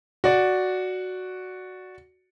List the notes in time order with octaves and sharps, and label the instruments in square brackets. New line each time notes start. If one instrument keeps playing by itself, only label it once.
[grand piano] F#4 D5